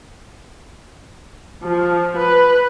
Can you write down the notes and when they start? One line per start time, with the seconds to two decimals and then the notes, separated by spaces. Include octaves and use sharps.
1.63 F3
2.17 B4